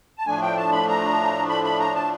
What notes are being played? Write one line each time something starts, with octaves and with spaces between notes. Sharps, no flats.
A5
A2 F3 A3 D4 G#5
G5
A5
B5
A#5
B5
B5
A#5
A5